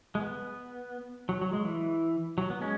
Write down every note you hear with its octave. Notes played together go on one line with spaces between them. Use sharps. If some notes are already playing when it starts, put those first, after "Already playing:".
G#3
B3
F#3
F#3
G#3
E3
F#3
B3
G#3 C#4